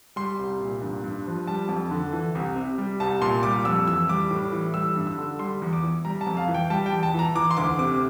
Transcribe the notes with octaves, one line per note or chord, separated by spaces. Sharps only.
G3 C6
C2
A#2
G2
G2
F3
G3 A5
F2
D3
E3
C2
C3
G3
C2 A5
A#2 C6
G3 D6
F2 E6
E3 E6
G3 D6
A2
E3
G3 E6
G2
E6
D3
G3 C6
E2
D6
E3
G3 A#5
A5
F2
F5
E3
G5
G3 A5
G5
E2
A5
E3 A#5
E3 D6
C6
D2 D6
C3 D6